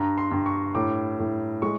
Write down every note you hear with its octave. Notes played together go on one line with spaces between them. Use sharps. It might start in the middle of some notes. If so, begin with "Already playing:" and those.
Already playing: G2 A#5
C6
G2
C#6
A2 D6
A2
G#3 C#6